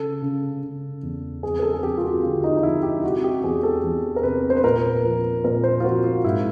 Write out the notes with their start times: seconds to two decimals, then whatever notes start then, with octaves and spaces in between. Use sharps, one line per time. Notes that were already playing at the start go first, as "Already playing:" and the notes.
Already playing: C#3 A4
0.22 C#3
0.63 C#3
1.03 E2
1.43 F2 G#4
1.59 A#4
1.63 A4
1.74 G#4
1.83 F2 G4
1.97 F4
2.03 F#4
2.23 D3 F4
2.44 D#4
2.57 D#4
2.63 F3 E4
2.83 G4
3.03 C3 F#4
3.24 G4
3.44 E2 G#4
3.63 A4
3.84 E2
4.16 A#4
4.23 C3 B4
4.50 C5
4.57 B4
4.64 A#2 A#4
5.04 F3
5.44 A#2 A#4
5.64 C5
5.80 F4
5.84 F3 F#4
6.04 F4
6.24 G#2 E4